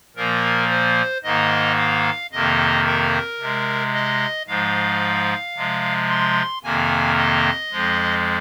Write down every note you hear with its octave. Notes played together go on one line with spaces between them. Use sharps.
A#2 F3 A#3 A#4
C5
G#2 D#3 A#3 D#5
F5
F2 C3 D#3 A#3 D#5
A#4
C3 G#3
D#5
G#2 F3 G#3 F5
C3 F3 G#3
C6
F2 C3 D#3 A#3 G#5
D#5
F2 F3 G#3